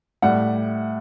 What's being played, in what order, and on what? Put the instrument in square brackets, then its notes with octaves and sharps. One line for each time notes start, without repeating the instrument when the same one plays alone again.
[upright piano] A2 G3 F#5